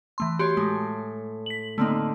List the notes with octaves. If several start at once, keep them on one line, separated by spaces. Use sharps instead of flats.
E3 A3 C6
F#4 G4 C#5 C6
A2 G#3
B6 F#7
D3 A3 A#3 C4 D#4